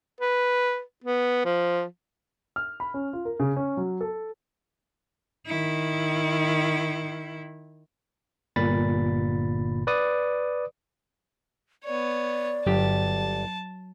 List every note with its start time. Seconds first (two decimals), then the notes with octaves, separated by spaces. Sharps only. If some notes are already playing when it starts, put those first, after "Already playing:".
0.21 B4
1.04 B3
1.45 F3
2.56 F6
2.80 B5
2.94 C#4
3.13 F4
3.25 A#4
3.40 C#3
3.57 C#4
3.77 F#3
4.01 A4
5.47 D#3 E4
8.56 G1 A#2 B5 A6
9.87 B4 D5 D#6
11.84 B3 C#5 D5
12.67 G1 F#3 G4 A5